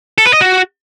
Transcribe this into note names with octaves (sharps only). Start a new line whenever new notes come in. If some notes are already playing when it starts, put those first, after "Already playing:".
A4
B4
D#5
F#4